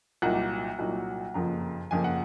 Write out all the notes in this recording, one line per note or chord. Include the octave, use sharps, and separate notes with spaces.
C2 A#2 F#3 A#3 D#4 F#5
C2 A#2 F#3 A#3 D#4
F#1 F2 C#3 F3 A#3 A#5
F#1 F2 C#3 F3 A#3 G#5
F#5